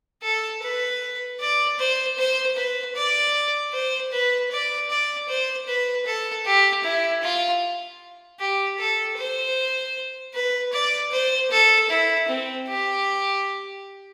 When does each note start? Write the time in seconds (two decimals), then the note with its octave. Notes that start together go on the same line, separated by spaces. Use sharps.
0.23 A4
0.62 B4
1.40 D5
1.79 C5
2.18 C5
2.56 B4
2.95 D5
3.73 C5
4.12 B4
4.51 D5
4.90 D5
5.29 C5
5.68 B4
6.06 A4
6.46 G4
6.84 E4
7.23 F4
8.40 G4
8.79 A4
9.17 C5
10.34 B4
10.73 D5
11.12 C5
11.51 A4
11.90 E4
12.28 C4
12.68 G4